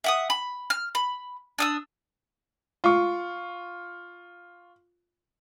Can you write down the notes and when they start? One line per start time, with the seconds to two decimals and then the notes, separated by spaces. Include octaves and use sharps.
0.04 E5 F#5 D#6
0.30 B5
0.70 F6
0.95 B5
1.58 D4 D#6 E6
2.84 F4 C#6